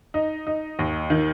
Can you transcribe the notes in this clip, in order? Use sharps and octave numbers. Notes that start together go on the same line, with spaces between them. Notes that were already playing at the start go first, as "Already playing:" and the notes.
D#4
D#4
D#2
D#3